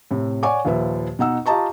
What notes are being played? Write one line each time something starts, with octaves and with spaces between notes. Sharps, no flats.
A2 C3
C#5 D5 F#5 G#5 C#6 D6
D#2 A#2 F3 B4 E5
B2 D#4 F#5 E6
F4 G4 D#5 A5 A#5 C#6